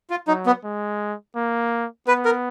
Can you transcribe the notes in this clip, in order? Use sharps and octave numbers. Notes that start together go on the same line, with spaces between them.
F4
F#3 D#4
B3
G#3
A#3
B3 B4
A#4